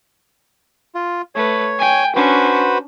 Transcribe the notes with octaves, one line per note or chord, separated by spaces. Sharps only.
F4
A3 B4 C#5
G5 G#5
C#4 D4 F#4 B4 C5